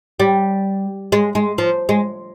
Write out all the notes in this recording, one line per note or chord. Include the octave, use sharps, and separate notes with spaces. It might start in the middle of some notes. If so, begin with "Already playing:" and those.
G3
G#3
G#3
F3
G#3